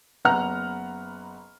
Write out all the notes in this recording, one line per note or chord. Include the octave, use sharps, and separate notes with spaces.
F#1 B3 F#5 A#5 F6